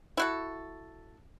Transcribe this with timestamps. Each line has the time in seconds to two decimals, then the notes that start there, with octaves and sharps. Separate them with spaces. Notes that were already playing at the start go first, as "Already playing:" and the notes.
0.17 E4 F#4 A4